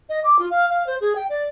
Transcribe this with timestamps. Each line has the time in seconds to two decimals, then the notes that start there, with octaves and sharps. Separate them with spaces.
0.09 D#5
0.24 D6
0.39 F4
0.50 F5
0.70 F5
0.87 C5
1.01 G#4
1.16 G5
1.29 D5